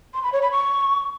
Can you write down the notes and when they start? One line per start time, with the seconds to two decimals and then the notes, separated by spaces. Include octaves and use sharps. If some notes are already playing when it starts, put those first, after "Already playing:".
0.14 C6
0.23 B5
0.33 C#5
0.42 B5
0.51 C#6